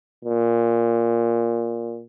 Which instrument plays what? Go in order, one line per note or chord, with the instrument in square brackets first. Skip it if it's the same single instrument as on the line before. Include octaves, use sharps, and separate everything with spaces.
[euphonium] A#2